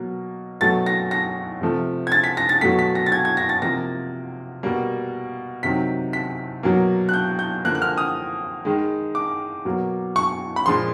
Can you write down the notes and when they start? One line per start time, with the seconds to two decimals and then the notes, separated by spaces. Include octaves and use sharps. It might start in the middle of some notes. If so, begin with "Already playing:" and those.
Already playing: B2 F#3 A#3
0.61 B2 F#3 A3 A6
0.86 A#6
1.11 A#6
1.61 C3 F3 A3
2.07 G#6
2.12 A6
2.24 B6
2.37 A#6
2.49 A6
2.61 B2 F#3 A3 B6
2.79 B6
2.95 A#6
3.06 A6
3.12 G#6
3.25 G#6
3.37 A#6
3.49 A6
3.62 C3 F3 A#3 A#6
4.63 B2 G3 A#3
5.63 C3 D#3 F#3 B6
6.13 B6
6.63 B2 F#3 A#3
7.09 F#6
7.14 G6
7.39 G6
7.65 D3 F3 A#3 F#6
7.75 F#6
7.82 F6
7.98 D#6
8.65 D#3 G#3
9.15 D6
9.65 B2 F#3 A#3
10.16 C#6
10.56 B5
10.66 A#2 F3 G#3 C6